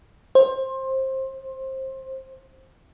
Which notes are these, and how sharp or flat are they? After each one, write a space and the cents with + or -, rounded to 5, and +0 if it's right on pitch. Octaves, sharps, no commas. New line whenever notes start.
C5 +20